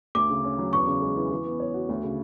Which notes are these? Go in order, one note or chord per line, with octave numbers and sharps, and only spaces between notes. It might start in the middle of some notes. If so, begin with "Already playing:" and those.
D2 D6
C#3
C#4
F#3
E2 C#6
C#3
G#3
E3
E3
B3
C#5
F#4
D2
C#3